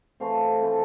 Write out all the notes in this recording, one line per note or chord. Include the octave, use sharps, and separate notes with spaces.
E3 A3 C4 F5
E3 A3 C4